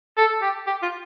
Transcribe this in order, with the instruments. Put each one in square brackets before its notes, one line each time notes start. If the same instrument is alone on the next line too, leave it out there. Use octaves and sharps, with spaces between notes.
[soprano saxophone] A4
G4
G4
F4